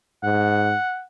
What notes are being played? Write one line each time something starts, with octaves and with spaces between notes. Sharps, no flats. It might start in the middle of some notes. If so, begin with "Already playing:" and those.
G#2 F#5